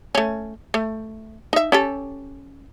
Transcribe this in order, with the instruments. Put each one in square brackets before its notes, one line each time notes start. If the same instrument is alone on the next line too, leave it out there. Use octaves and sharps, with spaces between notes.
[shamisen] A3 C#4
A3
D#4 E5
C#4 G4 A4